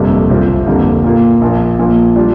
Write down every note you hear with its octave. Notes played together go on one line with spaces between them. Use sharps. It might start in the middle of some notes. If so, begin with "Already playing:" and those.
Already playing: G1 F2 C3 G3 A#3
C2 C3 G3 C4 F4
G1 F2 D3 G3 A#3
A#2 A#3 F4
A#1 A#2 F3
A#1 A#2 F3
G3 D4 F4